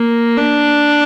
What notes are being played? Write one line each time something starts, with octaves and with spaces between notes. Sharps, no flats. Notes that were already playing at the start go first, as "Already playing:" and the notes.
Already playing: A#3
D4